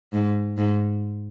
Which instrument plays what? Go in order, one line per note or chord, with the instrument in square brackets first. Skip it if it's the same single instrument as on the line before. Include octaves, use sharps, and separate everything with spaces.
[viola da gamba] G#2
G#2